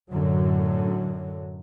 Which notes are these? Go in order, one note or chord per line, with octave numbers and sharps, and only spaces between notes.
F#2 A2 D3 F#3